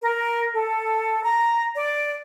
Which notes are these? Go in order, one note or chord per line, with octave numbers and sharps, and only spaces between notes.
A#4
A4
A#5
D5